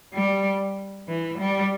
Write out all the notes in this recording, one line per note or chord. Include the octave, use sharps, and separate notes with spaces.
G3
E3
G3